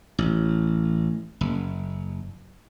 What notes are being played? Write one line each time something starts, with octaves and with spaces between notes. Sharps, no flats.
A1
F#1